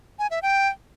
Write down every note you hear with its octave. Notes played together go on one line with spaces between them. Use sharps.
G#5
E5
G5